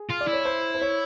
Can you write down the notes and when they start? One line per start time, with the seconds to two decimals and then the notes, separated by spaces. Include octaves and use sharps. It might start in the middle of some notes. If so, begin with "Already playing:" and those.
Already playing: G#4
0.10 F4
0.21 D5
0.27 E4
0.33 C#5
0.45 C5
0.75 C5
0.81 C#5